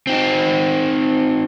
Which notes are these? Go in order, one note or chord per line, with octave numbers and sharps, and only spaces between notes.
C4 D#4